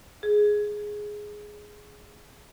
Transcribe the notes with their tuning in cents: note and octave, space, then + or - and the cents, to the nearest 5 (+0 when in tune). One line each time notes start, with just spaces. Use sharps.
G#4 +5